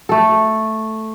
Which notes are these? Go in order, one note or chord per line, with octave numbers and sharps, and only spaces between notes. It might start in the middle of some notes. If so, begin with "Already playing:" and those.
A3 A4